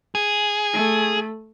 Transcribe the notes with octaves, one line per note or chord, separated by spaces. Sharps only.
G#4
A3